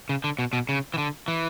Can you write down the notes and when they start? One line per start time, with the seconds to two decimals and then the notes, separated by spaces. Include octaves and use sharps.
0.09 C#3
0.24 D3
0.39 B2
0.53 B2
0.69 C#3
0.94 E3
0.98 D3
1.28 E3